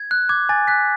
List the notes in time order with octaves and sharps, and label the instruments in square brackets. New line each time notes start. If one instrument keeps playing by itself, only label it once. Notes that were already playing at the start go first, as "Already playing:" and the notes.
Already playing: [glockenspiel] G#6
F#6
D6 G#6
G#5 A6
F#6 B6